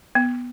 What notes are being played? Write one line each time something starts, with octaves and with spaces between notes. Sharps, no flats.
B3